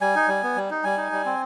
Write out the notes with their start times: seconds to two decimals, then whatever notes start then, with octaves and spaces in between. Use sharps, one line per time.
0.01 G3 G#5
0.15 D#4
0.28 G3
0.43 B3
0.56 G3
0.71 D#4
0.84 G3 G#5
0.98 D#4
1.12 G3
1.26 C4